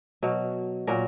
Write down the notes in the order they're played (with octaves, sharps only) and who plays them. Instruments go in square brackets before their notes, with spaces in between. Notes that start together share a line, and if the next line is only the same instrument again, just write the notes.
[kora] B2 F#3
A#2 F#3 A#4